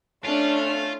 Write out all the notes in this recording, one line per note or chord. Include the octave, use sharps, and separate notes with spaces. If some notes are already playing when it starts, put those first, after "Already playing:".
A3 C#4 D4 F4